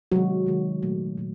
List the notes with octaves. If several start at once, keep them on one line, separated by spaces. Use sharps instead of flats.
C3 D#3 F#3 G#3 F#4
C3 D#3 G#3
A#2 F#3 A3
A#2 F#3